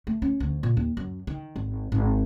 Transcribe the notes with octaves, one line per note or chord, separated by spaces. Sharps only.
A3
C#4
D2
A#2
D#2
F#2
D#3
G#1
G#1